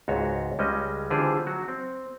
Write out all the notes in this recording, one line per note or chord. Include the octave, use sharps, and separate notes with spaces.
C#2 G#2 F#4 C#5
C#2 G3 G#3 C#4 D#5
D3 E3 F4 G4 G#4 C5
F#3 F#4
C4